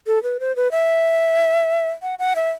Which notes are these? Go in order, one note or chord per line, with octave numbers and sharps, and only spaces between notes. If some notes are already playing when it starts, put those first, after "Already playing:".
A4
B4
C5
B4
E5
F#5
F#5
E5